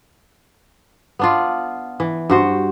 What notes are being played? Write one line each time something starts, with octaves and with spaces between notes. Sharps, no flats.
B3 D4 F4
E3
G2 F#4 C5